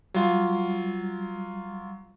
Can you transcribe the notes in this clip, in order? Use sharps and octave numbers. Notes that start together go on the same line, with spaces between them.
F#3 G3 F4